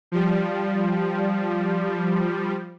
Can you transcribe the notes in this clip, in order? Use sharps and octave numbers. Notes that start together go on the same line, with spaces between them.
F3 G3